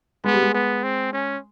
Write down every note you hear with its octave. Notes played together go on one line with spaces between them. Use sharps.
G#3 B3
G3
G#3
B3
C4
C#4